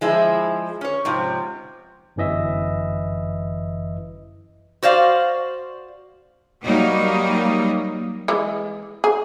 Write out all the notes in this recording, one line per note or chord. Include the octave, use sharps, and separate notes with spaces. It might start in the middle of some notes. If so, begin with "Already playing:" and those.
F3 G#3 E4
C#4 C#5
G#2 C3 F3
G1 F#2 E3 D#5 E5
F#4 C5 D5 F5
F#3 G3 A#3 D#4
E3 G#3
G#4